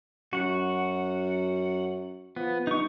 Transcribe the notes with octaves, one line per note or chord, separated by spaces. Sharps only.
F#2 F#4 F#5
F3 B3
G2 D#4 C#6